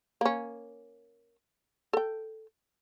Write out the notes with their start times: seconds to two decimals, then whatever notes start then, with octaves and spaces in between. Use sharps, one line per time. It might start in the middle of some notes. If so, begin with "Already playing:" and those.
0.21 A#3 C#4
1.93 A4 G5